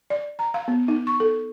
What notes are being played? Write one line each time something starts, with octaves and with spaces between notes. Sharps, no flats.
D5
A#5
F5
B3
D#4
C#6
A4